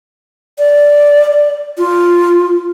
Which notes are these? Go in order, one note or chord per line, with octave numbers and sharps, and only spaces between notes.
D5
F4